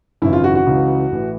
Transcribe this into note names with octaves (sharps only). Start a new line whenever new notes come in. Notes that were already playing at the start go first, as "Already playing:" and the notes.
G#1 F#2 C#3 E3 E4
F4
F#4
F#4
C#2 C#3 E3
A1 A2 E3